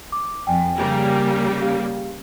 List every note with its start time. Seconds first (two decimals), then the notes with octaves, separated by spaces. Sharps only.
0.12 D6
0.47 F2 G5 G#5
0.77 C#3 G3 A#3
1.62 G4 F5